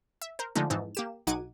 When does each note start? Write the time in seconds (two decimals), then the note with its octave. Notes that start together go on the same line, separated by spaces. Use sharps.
0.22 E5
0.39 A#4 C5
0.55 D3 D#3 F3 G#3 A3 D#4
0.70 F2 G#2 E3 D#4 A5
0.95 A#3 G4 E7
1.27 B1 D#4 F#5 D6 G#6 D#7